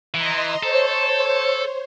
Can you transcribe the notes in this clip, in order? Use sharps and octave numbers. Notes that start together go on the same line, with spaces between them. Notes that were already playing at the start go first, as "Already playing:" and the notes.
E3 D#5 A#5 C6
A4 C5 C#5